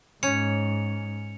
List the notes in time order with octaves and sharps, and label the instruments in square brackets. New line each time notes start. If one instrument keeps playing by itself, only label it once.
[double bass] G#2 [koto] C#4 [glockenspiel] C#7 F7